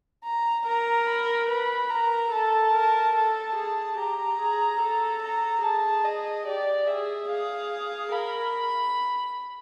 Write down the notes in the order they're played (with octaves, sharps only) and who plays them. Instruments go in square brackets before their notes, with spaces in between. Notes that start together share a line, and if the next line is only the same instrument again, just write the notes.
[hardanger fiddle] A#5
[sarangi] A#4 [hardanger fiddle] A#5
[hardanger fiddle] B5
[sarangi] B4 [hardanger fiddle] B5
[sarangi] A#4 [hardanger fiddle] A#5
[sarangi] A4 [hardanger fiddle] A5
[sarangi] A#4
[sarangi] A4 [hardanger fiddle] A5
[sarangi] G#4
[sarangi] G4 [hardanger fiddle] A#5
[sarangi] G#4
A4
[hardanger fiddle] A#5
[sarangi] G#4 [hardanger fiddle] A5
[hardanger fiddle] D#5
[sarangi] G4 [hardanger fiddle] D5
[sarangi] G#4 [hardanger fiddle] E5
[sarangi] G#4 [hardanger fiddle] F5
[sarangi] A#4 [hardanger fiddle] B5